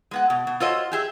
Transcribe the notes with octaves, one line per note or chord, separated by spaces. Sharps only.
G#3 B3 F#5
B2
B2
F4 F#4 A4 C5 C#5 D#5
G4 G#4 E5